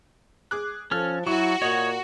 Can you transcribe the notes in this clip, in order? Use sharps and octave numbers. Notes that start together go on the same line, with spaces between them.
G#4 D6 F#6
F3 C#4 A4 F6
F#3 E4 F#4 C#6
A#2 C#5 D#5 F#7